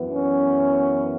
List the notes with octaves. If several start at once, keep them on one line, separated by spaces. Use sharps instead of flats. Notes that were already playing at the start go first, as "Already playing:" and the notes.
Already playing: F#2 E3 B3
C#4